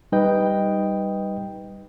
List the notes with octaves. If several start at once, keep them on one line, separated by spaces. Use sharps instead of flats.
G3 D#4 B4 D#5 G5